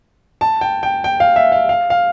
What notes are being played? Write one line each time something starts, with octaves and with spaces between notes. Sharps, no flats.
A5
G5
G5
G5
F5
E5
F5
F5
F5